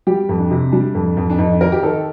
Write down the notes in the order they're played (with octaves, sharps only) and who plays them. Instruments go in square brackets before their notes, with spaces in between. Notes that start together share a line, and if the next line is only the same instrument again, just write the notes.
[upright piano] G3 G4
F2
D4
C3
G3 D4
F2
F2
D4
F2 D#4
D#3 A#4
G4
D#3 A4